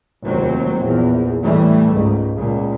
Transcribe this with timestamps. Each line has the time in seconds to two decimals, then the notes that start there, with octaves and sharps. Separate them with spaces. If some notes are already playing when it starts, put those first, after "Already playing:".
0.23 F1 D#2 F#3 C4
0.82 A#1 E2
1.42 A2 E3 G3 A3
1.92 C#2 G#2
2.36 C#2 A#2